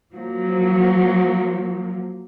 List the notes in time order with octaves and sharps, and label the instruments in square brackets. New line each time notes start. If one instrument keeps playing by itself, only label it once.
[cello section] F3 F#3 A#3